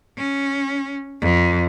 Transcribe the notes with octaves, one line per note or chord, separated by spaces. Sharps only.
C#4
F2